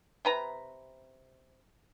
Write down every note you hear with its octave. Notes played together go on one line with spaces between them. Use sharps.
C3 B4 A#5